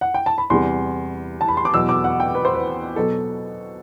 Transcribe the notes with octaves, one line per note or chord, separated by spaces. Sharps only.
F#5
G5
A5
B5
E2 C3 G3 C6
A5
B5
C6
D6
E2 B2 F#3 E6
D6
F#5
G5
B4
C5
B4
B2 F#3 A4